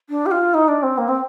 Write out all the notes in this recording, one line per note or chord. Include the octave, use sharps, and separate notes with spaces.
D4
G4
F4
D#4
D4
C4
A#3
C4